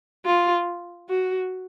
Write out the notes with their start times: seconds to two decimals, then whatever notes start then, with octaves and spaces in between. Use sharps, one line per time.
0.26 F4
1.09 F#4